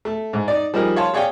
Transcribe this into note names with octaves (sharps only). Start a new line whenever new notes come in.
A3
G#2
D#4 D5
F3 G3 D#4 G#4 A#4
C#5 F5 A5 C6
G#4 C#5 D5 F5 G5